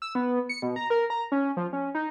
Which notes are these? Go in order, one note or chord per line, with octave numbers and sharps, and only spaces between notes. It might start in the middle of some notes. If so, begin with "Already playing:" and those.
E6
B3
C#7
B2
A#5
A#4
A#5
C#4
F3
C#4
D#4